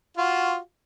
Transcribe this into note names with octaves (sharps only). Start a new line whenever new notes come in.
F4 F#4